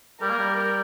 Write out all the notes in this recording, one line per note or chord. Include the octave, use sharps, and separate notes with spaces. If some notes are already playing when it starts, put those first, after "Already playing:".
G3 A#4
A#3
G3